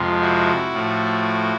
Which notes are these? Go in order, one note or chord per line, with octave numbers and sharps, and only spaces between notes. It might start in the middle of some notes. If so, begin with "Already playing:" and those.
Already playing: F2 C3 F3 G#3
E4 F#4
A2 F3 A3